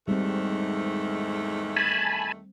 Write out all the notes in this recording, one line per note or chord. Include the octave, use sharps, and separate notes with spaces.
E2 G#2 D#3 G3 A3 C4
G#5 A5 B5